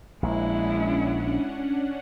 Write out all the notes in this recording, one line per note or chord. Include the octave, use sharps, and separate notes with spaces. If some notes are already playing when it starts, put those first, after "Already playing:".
A#1 G#3 C#4 D4 E4 F#5